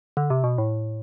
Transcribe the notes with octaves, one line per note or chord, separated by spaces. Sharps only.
D3
C3
B2
A2